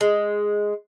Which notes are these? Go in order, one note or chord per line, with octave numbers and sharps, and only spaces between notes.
G#3